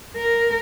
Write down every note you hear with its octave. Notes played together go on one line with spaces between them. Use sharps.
A#4